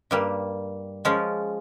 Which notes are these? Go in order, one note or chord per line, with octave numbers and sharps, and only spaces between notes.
G2 G3 A#3
F3 G#3 C#4 F4